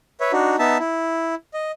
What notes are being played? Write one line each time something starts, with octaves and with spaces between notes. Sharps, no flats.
B4 C#5 E5
D4 D#4 F#4
B3 D#4 E5 A5
E4
D#5